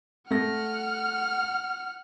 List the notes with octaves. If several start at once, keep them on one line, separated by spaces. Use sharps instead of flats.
A3 F#5 F6 A#6